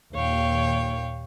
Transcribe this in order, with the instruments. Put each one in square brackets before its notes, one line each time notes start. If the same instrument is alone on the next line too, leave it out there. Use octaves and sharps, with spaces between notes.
[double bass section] D#2 A#2 [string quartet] C#5 F5 G5